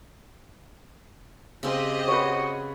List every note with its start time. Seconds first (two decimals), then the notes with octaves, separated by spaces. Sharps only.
1.63 C#3 C4 G4 C5 D#5
2.08 F#4 B4 C#5